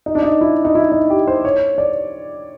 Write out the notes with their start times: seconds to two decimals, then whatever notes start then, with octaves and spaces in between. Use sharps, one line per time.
0.06 D#4
0.15 D4
0.23 D#4
0.41 E4
0.65 D#4
0.75 E4
0.92 D#4
1.10 G4
1.27 C5
1.45 C#5
1.78 D5